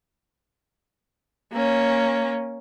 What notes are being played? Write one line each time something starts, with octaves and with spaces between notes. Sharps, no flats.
A#3 C#4